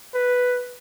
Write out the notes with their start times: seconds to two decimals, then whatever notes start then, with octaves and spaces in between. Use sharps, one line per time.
0.14 B4